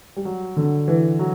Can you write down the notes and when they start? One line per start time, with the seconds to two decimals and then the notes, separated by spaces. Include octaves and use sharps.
0.16 G3
0.25 F#3
0.57 D3
0.88 E3
1.19 F#3